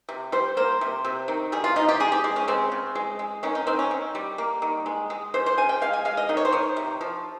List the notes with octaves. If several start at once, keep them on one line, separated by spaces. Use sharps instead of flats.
C3
G3 C5
A#3 C5
C3
C3
D#3
G3 G#4
F4
C3 D#4
G4
G#3 G#4
G4
G#3
C#4
C#3 C4
C#3
G#3
G#3
D#3 C#4
D#4
D#3 C4
C#4
D#3
G3
A#3
D#3
G#3
G#3
C#3 C5
C5
C#3 G#5
G5
G#3 F5
G#5
G#3 F5
D#5
D#3 D#5
C#5
C5
D#3 C#5
C3
F3